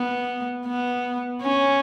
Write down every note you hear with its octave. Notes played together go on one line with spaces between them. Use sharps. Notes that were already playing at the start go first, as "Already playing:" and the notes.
Already playing: B3
B3
C#4